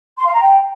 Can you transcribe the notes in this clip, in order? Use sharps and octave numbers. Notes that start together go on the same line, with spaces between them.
C6
F5
A#5
G5